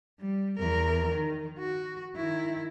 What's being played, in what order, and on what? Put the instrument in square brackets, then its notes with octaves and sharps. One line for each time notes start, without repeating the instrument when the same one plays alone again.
[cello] G3
E2 A#4
D#3
F#4
D#3 E4